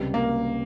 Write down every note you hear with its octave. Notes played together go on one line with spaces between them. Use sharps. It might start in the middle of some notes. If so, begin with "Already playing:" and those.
Already playing: C#2 C3 G3 C4 G4
A#3